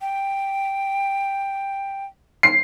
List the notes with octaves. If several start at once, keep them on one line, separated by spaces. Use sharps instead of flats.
G5
C7